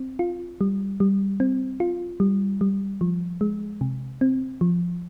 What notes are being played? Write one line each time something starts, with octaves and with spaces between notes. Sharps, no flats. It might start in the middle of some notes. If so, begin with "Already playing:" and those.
Already playing: C4
F4
G3
G3
C4
F4
G3
G3
F3
G#3
C3
C4
F3